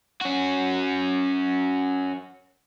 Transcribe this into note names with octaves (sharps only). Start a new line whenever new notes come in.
C#4 F#4